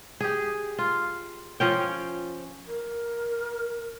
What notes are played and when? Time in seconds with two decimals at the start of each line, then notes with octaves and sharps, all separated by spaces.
0.20 G4 G#4
0.78 F4
1.60 F3 C#4 G5
2.67 A#4